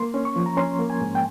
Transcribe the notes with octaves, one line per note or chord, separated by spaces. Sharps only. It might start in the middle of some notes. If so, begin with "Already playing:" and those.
Already playing: A#3 C6
C#4
C#6
F3
A#5
C#4 C6
A#3
G#5
G#2
G5